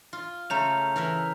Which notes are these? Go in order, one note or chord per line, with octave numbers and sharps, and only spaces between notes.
F4
C#3 A3 A#5 G6 F7
E3 A#4 E5